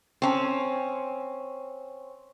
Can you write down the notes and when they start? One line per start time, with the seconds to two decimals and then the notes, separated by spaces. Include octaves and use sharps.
0.22 C4 C#4